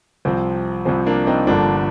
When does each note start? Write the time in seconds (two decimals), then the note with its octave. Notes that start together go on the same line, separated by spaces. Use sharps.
0.25 C2 C3 F3 C4
0.85 C2 C3 F3 C4
1.06 A#3 D4
1.27 C4 D#4
1.47 G1 G2 D3 F3 A#3 D4